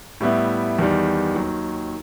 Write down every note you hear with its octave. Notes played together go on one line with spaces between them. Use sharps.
A2 G3 B3 E4
E2 D#3 G3
D#2 D#3 F#3